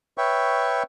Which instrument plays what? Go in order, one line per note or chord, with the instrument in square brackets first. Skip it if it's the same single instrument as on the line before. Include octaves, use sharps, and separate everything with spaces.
[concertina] B4 C#5 E5 G5 C#6